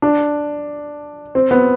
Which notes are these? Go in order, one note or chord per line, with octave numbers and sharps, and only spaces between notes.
D4
C4
B3